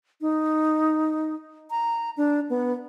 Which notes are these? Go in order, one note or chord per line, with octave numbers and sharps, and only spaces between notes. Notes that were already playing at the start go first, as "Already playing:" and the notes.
D#4
A#5
D4
B3